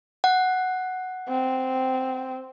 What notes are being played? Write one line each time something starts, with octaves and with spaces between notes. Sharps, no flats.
F#5
C4